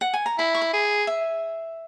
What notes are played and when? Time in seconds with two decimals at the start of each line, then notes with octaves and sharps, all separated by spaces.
0.01 F#5
0.13 G#5
0.26 A#5
0.39 E4 B5
0.55 C#6
0.61 B5
0.73 G#4
1.07 E5